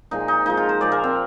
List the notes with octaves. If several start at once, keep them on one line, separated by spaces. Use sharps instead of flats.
A#2 F3 G#3 D#4
D#4
A#2 F3 G#3 D#4
F4
C5
A#2 F3 G#3 D5
A#4
C4